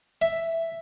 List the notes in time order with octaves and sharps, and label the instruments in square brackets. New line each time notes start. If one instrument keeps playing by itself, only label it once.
[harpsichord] E5